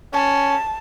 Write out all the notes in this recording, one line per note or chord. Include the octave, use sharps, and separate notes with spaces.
C#4 A5